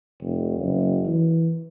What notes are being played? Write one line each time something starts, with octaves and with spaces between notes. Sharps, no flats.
F1
F#1
E3